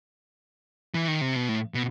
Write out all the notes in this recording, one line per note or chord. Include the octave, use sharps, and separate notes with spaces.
E3
D#3
C3
B2
A2
B2